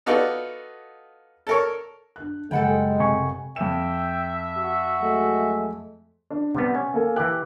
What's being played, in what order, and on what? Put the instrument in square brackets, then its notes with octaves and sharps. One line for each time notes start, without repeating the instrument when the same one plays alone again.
[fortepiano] B3 D#4 F4 F#4 A4 D5
A4 A#4 C#5
[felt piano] D4 F#6
[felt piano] F#1 G3 B5 [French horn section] G#3 [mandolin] A4 F#5 G5
[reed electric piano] C3 G#5 C#6
[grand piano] F2 E7 [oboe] E5 [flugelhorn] G5
[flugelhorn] F#4
[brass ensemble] F#3 G#3 A3
[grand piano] D4
[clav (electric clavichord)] C3 G3 B3 [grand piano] F#5
[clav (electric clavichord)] C#4
[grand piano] A#3 A4 G#5
[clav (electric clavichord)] E3 G4 [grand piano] F#6